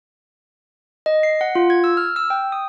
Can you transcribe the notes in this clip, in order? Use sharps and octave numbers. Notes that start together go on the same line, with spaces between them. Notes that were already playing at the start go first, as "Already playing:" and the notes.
D#5
C7
F#5
F4
G#6
E6
F6
E6
G5
D#6